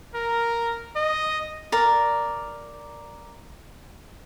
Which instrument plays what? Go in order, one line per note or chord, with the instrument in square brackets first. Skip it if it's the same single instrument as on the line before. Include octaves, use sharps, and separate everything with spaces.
[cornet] A#4
D#5
[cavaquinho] A#4 D5